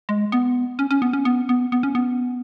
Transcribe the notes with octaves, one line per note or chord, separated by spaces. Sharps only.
G#3
B3
C#4
C#4
B3
C#4
B3
B3
B3
C#4
B3